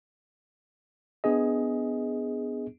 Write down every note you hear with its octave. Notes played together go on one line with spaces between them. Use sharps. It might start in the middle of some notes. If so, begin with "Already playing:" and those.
B3 D4 G#4 D#5